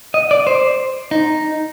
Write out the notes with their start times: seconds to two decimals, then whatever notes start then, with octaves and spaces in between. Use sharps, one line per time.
0.14 D#5
0.31 D5
0.47 C5
1.11 D#4